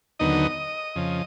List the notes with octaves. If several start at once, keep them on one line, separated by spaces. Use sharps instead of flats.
D#2 D3 F#3 B3 D#4 D#5
F2 C#3 F3